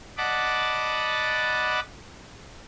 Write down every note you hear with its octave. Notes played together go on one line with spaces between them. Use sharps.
D5 D#5 F#5 A5 B5 D6